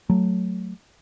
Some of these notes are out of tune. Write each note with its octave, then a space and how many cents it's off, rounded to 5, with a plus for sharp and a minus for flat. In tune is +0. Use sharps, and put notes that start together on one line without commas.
F#3 +0 A3 +0